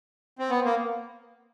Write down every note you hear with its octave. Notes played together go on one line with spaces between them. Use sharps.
C4
B3
A#3